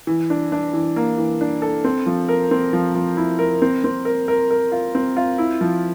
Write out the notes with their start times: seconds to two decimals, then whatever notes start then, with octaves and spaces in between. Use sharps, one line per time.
0.07 E3
0.30 D4
0.52 D4
0.74 E3
0.96 A#3
1.18 E3
1.41 D4
1.62 A4
1.84 C4
2.06 F3
2.29 A#4
2.51 C4
2.73 F3
2.95 F3
3.17 E4
3.39 A#4
3.62 C4
3.84 C4
4.05 A#4
4.28 A#4
4.51 A#4
4.72 F4
4.95 C4
5.17 F4
5.38 E4
5.61 F3